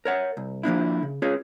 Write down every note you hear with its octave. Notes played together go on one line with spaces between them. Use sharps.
A#4 C#5 F#5
C2
F3 A#3 D4 E4
C#3
C#4 F4 G#4 C#5